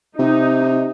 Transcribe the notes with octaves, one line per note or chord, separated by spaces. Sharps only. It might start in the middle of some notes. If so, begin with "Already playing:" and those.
C3 D#4